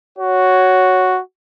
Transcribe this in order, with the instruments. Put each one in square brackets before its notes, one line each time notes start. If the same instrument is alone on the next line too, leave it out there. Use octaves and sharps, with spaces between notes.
[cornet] F#4 [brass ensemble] C#5